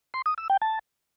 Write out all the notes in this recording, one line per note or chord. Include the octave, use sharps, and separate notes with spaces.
C6
D#6
E6
G5
A5